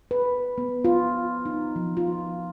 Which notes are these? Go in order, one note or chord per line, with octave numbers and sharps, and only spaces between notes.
B4
B3
F4
D#4
F3
F4